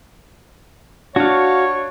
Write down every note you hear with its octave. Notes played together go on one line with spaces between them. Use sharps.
D4 F#4 C#5 F5